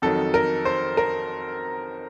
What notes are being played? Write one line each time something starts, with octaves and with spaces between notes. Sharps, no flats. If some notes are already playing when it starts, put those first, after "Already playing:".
F2 D#3 F#3 A4
A#4
C5
A#4